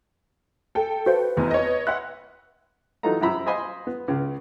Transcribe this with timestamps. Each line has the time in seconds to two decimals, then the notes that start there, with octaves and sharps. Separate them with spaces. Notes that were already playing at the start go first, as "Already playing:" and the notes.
0.75 A4 G5
1.06 F#4 B4 C5 F5
1.37 F1 E2
1.51 C#5 D#5
1.87 E5 F#5 B5 C6 F#6
3.03 E3 F#3 D#4 F4 A4 A#5
3.21 F#2 F3 A#5 B5 E6
3.46 C5 D#5 F5 G#5 B5 C6
3.87 B3
4.08 C#2 C#3